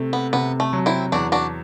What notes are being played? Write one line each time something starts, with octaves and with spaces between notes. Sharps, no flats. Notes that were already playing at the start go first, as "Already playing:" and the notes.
Already playing: C3 A3
B3
C3 B3
A3
F#3
C4 E4
E2 D4 F#4
D4 F#4